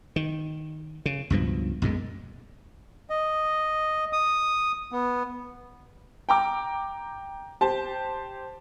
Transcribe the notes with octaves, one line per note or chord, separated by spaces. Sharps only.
D#3
C#3
C#2 G2 B2 F3
B1 F#2 A#2 G#3
D#5
D#6
B3
G5 A#5 D6
G4 C5 A5